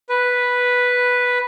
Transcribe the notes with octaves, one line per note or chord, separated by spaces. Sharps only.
B4